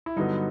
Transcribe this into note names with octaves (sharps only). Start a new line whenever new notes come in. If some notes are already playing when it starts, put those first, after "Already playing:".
E4
G2 D3 F#3 B3 D#4